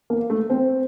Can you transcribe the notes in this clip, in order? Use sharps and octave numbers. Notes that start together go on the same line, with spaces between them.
A#3
A3
C4